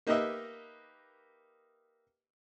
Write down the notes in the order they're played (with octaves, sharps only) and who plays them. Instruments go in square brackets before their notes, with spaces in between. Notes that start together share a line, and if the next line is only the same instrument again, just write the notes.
[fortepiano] A#3 D#4 G4 B4 D#5 E5